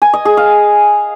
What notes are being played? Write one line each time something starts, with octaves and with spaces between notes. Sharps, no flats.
G#5
D#5
G#4
F5